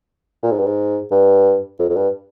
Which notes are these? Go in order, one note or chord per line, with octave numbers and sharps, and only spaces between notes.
A#2
G#2
G2
G#2
G2
F2
F2
G2